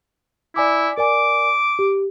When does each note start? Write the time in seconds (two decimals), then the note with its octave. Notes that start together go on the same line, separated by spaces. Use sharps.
0.56 E4 D5 G#5 D6
0.97 A#4 D5 G#5 D6
1.79 G4